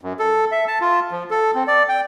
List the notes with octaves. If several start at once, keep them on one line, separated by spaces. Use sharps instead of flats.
F#2
A4
E5
A5
F4
F3
A4
C4
D5
G5